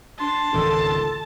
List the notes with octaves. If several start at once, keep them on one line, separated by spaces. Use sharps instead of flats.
D4 A5 C6
G#1 C#2 D#3 A4